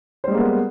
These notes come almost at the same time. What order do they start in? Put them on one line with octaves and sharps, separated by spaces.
C5 G3 G#3 A#3 B3